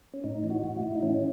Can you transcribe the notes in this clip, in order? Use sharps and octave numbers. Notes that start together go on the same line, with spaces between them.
C#4
A2 D#4
E3
F#4
A2
E4
A2
D#4
E3 C#4